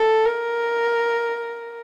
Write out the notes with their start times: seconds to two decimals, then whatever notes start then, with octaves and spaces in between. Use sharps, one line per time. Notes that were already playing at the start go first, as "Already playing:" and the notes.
Already playing: A4
0.25 A#4